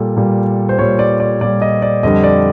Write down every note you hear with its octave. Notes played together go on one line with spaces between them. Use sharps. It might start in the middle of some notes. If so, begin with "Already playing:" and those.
Already playing: A#2 G3 A4
A#2 G3
C5
A#2 G3 C#5
D5
D5
A#2 G3 D5
D#5
D5
F2 D3 G3 D#5
D5